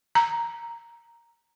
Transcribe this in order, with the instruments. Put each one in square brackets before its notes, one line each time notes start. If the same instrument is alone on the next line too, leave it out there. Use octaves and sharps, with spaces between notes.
[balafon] A#5